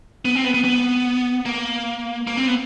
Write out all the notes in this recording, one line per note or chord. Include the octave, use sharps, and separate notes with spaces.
B3
C4
B3
B3
B3
A#3
A#3
C4
B3